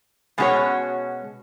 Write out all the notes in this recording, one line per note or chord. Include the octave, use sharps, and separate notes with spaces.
B2 G#3 C#4 F#4 C#5